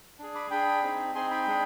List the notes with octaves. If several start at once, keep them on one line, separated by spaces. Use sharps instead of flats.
D4 G#4
B5 D6
D4 G#4 G5 B5
C4 D#4 G#4
C4 D#4 G#4 G#5 C6
G5 B5
G#3 D4 G#4